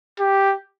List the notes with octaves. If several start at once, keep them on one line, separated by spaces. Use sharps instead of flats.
G4